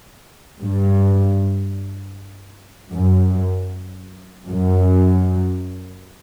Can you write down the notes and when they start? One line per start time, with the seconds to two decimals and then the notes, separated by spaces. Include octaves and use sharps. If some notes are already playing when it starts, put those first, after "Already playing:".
0.61 G2
2.92 F#2
4.47 F#2